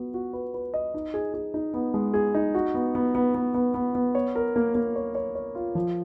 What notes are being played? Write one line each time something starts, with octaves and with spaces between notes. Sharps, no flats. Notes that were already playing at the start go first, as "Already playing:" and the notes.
Already playing: B3 F#4
F#4
B4
B4
D#5
D#4
G#4
G#4
D#4
B3
G#3
G#4
D#4
F#4
B3
B3
B3
B3
B3
B3
B3
C#5
A#4
A#3
A#3
C#5
C#5
C#5
F4
F3